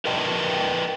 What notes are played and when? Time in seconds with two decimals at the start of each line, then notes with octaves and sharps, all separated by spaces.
0.05 A#4 B4 D5 D#5 G5 A5